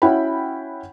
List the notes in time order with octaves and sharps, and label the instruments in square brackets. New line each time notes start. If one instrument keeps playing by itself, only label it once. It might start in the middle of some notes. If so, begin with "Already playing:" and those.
[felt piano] C#4 E4 F#4 F#5 G5 B5